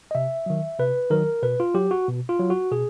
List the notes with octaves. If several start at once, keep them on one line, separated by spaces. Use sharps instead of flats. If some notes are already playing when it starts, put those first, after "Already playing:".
D#5
C3 E5
D#3 F#3
C3 B4
D#3 F#3 A#4
B2 B4
F4
F#3 G4
F#4
B2
F4
F#3
F#4
B2 G#4